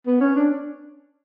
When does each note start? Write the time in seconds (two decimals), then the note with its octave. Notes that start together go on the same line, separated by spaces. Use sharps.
0.06 B3
0.21 C#4
0.36 D4